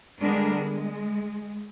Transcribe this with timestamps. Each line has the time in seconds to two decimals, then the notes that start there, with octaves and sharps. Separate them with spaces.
0.20 D3 G3 G#3 B3 D4 A#4
0.54 G#3